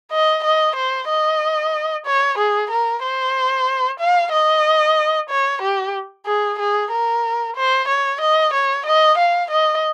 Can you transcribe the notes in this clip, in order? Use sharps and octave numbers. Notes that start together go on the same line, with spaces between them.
D#5
D#5
C5
D#5
C#5
G#4
A#4
C5
F5
D#5
C#5
G4
G#4
G#4
A#4
C5
C#5
D#5
C#5
D#5
F5
D#5